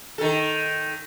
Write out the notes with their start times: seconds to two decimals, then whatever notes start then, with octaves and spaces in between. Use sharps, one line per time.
0.18 D#3 A4